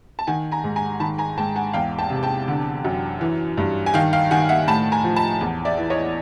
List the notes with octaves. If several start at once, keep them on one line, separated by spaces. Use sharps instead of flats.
A5
D#3 F#5 G#5
G#5 A#5
G#2
G#5 A#5
D#3 A5 B5
G#5 A#5
G#2 G5 A5
F#5 G#5
E2 F5 G5
G5 A5
C3
G5 A5
D3
F#2
E3
G2
G#5
D#3 F5 G5
F5 G5
D#3 F#5 G#5
E5 F#5
A2 A5 B5
G#5 A#5
F3
A5 B5
E2
D5 E5
E3
C#5 D#5